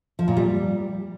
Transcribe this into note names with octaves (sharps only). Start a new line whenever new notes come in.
F3
A#2
G3